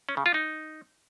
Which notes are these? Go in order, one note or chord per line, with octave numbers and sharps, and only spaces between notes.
C#4
C#3
F4
D#4